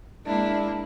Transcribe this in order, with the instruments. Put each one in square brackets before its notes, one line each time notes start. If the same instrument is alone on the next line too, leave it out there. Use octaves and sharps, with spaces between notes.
[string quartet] G#3 A#3 D4 E4